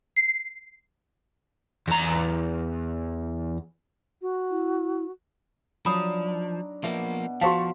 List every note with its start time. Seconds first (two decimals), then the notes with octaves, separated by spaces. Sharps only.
0.16 C7
1.88 E2 A#5
4.22 F#4
4.51 E4
5.86 F3 F#3 D4 D#4 A#5 B5 D#6
6.84 B2 F3 A#3 E5
7.41 F3 F#4 C5 F5 A5 C#6